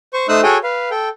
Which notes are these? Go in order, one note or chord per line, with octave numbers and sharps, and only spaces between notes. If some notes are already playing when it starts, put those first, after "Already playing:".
C5 C#6
A3 D#4 C5 D#6 E6 F#6
F#4 G#4 A4 C#5 G5 G#5
B4 F5
A4 G5